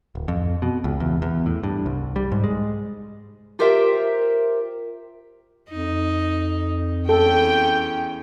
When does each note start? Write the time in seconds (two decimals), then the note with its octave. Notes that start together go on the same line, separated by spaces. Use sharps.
0.15 D1
0.28 F2
0.62 B2
0.84 C#2
1.00 E2
1.22 E2
1.46 A2
1.63 G2
1.86 C2
2.16 G3
2.32 G#2
2.44 G#3
3.59 F4 G4 A#4 C5 E5 G5
5.70 F2 D#4
7.09 E2 C#4 A4 G5